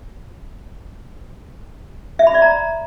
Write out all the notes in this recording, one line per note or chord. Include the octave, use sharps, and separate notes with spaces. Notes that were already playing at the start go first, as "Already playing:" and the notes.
E5
B5
D5
A#5